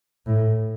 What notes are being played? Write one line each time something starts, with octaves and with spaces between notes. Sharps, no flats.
A2